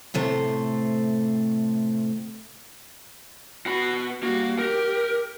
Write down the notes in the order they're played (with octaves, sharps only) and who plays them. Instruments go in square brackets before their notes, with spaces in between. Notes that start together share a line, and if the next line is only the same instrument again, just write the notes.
[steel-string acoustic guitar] A2 C3 A3 C5
[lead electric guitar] B2 B5 [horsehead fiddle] F#4
[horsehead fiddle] G3 F#4 [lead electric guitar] A#3
[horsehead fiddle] G4 [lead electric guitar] A#4